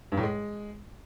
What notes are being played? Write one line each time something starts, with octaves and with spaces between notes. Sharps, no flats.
G2
A2
G#3